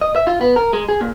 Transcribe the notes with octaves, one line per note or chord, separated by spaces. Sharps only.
D#5
E5
F4
B3
A#4
G#3
G#4
A#2